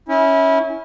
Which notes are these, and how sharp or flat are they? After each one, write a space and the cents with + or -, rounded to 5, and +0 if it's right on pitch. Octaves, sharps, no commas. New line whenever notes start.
C#4 +0 E4 -25